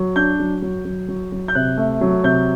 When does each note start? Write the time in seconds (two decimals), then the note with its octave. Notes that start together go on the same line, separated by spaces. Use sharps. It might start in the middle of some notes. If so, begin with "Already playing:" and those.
Already playing: F#3
0.16 D4 G6
0.39 F#3
0.62 F#3
0.85 F#3
1.08 F#3
1.32 F#3
1.48 G6
1.55 C3 F#6
1.77 A3
2.01 F#3
2.24 C3 G6